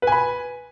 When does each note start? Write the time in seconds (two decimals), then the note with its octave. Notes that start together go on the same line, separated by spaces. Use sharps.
0.02 B4
0.07 G#5
0.12 B5